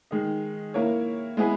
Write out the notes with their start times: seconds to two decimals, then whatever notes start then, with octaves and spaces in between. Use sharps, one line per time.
0.11 D#3 G#3 D#4
0.74 A#3 E4 A#4 C#5
1.37 G#3 B3 E4 G#4 B4